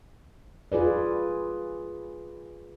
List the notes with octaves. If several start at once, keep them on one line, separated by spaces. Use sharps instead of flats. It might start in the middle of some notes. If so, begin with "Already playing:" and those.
F4 G#4 B4 D5